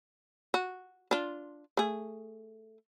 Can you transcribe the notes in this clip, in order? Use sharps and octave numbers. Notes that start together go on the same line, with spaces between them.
F#4
D4 F4
A3 G#4